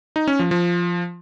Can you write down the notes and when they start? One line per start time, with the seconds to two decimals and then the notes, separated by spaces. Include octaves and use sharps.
0.16 D#4
0.28 C#4
0.39 F3
0.51 F3